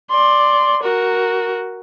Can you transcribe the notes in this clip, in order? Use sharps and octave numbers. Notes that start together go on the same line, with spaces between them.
D5 C6
F#4 A#4